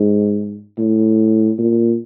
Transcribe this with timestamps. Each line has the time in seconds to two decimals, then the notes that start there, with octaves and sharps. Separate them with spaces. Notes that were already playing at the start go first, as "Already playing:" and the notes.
Already playing: G#2
0.78 A2
1.58 A#2